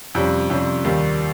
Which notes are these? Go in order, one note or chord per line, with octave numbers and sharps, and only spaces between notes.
F2 C3 G3 C#4
F2 C3 G3 C#4
D#2 D#3 G3